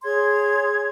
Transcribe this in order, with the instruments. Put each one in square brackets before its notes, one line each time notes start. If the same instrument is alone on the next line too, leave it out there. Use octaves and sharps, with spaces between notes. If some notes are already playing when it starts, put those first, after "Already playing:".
[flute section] G#4 C#5 C6 G#6